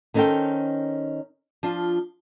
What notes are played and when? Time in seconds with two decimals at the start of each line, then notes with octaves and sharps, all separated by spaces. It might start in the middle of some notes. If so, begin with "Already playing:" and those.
0.14 D#3 C#4 D#4 A4 C5 G5
1.63 F3 D4 F4